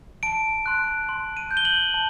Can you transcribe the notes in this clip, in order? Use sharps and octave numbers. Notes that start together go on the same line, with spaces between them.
A5 D7
C6 F#6
C6
D#7
G6
G7
F#7
A5